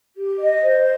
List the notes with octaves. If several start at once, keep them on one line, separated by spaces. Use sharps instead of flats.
G4
D#5
C5